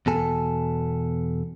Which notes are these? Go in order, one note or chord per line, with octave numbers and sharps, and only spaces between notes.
E2 B2 A4 G#5